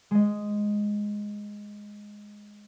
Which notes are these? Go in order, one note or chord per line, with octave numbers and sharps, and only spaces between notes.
G#3 D#5